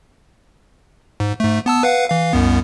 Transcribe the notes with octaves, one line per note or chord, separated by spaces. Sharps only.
G#2
G#2 A3
B3 A5 E6
B4 F5 F#5
E3 F5
C2 F#2 B3